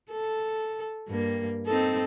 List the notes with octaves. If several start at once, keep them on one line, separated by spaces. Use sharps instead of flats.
A4
G2 A#3
C4 D#4 A4